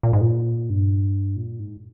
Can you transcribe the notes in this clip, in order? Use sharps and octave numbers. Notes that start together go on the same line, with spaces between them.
A#2
G#2
A#2
G2
A#2
G#2